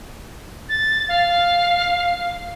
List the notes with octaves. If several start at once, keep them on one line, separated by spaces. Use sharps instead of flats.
A6
F5